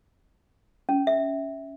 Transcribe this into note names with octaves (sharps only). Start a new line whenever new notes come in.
C#4
E5